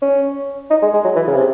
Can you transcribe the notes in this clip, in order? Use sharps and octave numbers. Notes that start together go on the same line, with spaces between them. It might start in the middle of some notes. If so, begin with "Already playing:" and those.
C#4
D#4
G#3
G#3
F#3
E3
C#3
C3